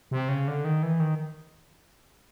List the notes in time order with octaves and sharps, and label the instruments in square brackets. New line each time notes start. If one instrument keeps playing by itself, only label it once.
[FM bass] C3
C#3
D3
D#3
E3
D#3